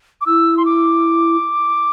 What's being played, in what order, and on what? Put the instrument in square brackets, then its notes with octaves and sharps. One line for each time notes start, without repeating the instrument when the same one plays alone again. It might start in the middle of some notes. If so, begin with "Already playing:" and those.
[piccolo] D6
[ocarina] E4 [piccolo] E6
[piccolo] C6
D6